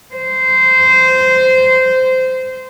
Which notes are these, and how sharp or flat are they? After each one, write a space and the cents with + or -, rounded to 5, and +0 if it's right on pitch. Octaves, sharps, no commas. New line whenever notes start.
C5 -15